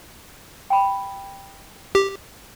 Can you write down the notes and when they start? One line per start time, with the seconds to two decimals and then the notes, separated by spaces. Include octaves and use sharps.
0.70 G5 B5
1.95 G4